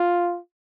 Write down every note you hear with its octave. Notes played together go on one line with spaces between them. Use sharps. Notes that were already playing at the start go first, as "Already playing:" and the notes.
Already playing: F4